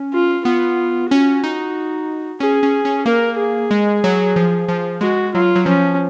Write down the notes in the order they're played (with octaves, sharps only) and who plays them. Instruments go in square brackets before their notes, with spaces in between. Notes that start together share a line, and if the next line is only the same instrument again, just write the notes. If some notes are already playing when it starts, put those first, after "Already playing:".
Already playing: [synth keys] C#4
[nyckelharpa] F4
[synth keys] B3 [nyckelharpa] F4
[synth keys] C#4 [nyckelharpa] F#4
[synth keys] D#4
[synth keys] C#4 [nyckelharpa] G#4
[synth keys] C#4
C#4
[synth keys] A#3 [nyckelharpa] A#4
[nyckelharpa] G#4
[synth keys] G#3
F#3
F3
F3
[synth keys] G#3 [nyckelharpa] F#4
[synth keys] F#3 [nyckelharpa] F4
[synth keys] F#3
[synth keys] F3 [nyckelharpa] C#4